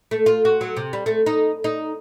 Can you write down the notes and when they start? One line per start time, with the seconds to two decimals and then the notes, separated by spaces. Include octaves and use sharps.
0.11 A3
0.26 F4
0.45 F#4
0.61 F#3
0.77 C3
0.93 G3
1.06 A3
1.26 D#4
1.64 D#4